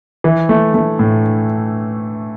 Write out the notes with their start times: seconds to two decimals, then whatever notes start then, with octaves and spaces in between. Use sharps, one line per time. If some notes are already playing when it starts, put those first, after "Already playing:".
0.24 E3
0.49 A3
0.74 A3
0.99 A2